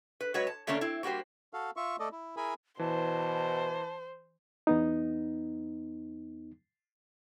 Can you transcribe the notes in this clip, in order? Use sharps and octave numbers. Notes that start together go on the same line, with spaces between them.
B4
F#3 G#3 F#4 B4 C#5
A5
D3 A3 A#3 C#4 D4
C4 E4
G3 A#3 F#4 G4 C5
F#4 A4 F5
F4 E5 C#6
A3 A4 D5 D#5
E4
E4 G#4 A#4 G#5 B5
B2 E3 C5 A5
E2 B3 D#4